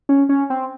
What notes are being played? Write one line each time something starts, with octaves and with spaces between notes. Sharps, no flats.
C#4
C#4
C4